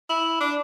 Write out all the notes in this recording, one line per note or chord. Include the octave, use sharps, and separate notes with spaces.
E4
D4